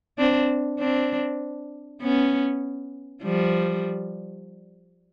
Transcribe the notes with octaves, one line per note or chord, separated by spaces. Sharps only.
C4 D4
C4 D4
B3 C#4
F3 G3